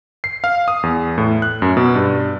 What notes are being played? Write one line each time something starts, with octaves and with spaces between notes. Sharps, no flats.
C7
F5
D#6
E2
A2
F#6
F#2
B2
G2